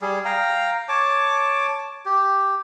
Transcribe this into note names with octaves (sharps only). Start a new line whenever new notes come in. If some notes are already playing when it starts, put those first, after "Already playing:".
G3 G#4
F5 G5 A#5
C#5 A5 D6
G4